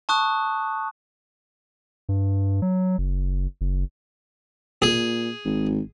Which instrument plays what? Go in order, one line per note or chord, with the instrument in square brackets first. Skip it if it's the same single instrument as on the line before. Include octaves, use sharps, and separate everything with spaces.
[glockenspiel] A5 C#6 D#6 F#6
[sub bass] G2
F#3
F#1
F#1
[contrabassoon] A#2 [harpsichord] G#4
[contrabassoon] G#1